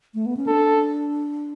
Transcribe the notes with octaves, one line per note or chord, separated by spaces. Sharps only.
A3
B3
C#4
D4 A4